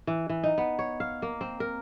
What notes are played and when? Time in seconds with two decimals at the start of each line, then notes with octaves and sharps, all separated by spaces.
0.07 E3
0.29 E3
0.43 D#4
0.58 B3
0.79 C#5
1.00 F5
1.22 A#3
1.41 C4
1.60 A#4